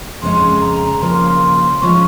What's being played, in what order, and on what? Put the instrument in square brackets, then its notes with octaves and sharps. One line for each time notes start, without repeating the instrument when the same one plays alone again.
[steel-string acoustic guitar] F2 C#3 G#3 C#4 G#4 [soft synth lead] C6
[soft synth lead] A#5
[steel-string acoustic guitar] C#3 F3 A#3 C#4 [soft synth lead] C6
[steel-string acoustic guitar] C#3 F3 G#3 C#4 [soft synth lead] C#6